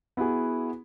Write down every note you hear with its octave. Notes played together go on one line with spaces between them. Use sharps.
B3 E4 F#4 G#4